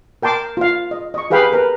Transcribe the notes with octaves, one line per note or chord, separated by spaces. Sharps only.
A#4 G5 A5 C6 D6
F4 F5
D#5
D#5 C#6
G4 G#4 B4 F5 G5 B5
A#4 B4